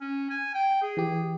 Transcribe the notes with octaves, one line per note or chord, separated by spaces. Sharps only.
C#4
G#5
G5
G#4
E3 G4